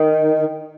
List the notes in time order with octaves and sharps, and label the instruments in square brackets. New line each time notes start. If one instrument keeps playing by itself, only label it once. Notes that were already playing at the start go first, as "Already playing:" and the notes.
Already playing: [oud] D#3